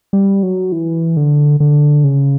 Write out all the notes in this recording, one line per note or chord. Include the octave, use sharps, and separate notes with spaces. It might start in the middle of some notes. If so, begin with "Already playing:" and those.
G3
F#3
E3
D3
D3
C#3